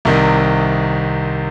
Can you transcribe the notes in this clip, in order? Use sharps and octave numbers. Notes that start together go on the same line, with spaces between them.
C2 C3 D#3